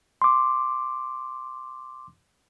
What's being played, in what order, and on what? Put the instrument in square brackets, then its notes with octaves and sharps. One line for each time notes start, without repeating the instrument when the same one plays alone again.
[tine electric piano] C6 D6